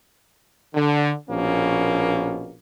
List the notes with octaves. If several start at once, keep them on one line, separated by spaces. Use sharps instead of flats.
D3
A#1 B2 A#3 C#4